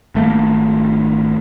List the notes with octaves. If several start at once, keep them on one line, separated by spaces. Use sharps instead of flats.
G#1 A3 A#3